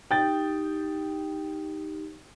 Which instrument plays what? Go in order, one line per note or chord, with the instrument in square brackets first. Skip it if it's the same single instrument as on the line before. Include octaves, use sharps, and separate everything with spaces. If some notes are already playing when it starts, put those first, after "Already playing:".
[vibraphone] D#4 G4 [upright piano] G5 A6